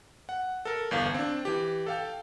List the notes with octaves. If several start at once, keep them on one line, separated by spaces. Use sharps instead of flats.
F#5
A4 A#4
G1 E2 F5
C4 D4
E3 G4
A4 F5 G5